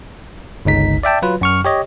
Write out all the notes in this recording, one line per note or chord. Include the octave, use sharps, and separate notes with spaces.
G1 C#2 D#4 B6
D5 E5 G5 A5
F#3 F4 B4
F#2 C#6 F6
G4 C#5 D#5